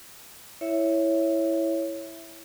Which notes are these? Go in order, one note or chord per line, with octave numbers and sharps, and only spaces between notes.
E4 C#5 E5